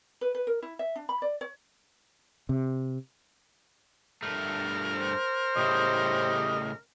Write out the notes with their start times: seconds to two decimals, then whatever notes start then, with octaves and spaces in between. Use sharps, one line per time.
0.21 B4
0.35 B4
0.47 A#4
0.62 E4
0.79 E5
0.96 D4
1.09 B5
1.22 D5
1.41 C#5
2.49 C3
4.23 G2 A3 A#4
4.95 C5
5.57 A2 C#3 G3 D#5